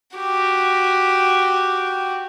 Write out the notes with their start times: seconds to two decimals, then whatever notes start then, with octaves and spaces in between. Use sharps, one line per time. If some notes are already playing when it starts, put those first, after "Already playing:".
0.17 F#4 G4